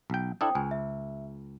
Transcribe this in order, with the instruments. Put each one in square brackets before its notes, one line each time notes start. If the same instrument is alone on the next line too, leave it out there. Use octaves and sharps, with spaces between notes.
[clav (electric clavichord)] B1 G5
[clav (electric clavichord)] D4 E4 A4 [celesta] C5 G5 D#6
[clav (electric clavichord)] C#2 [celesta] G#5
[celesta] E5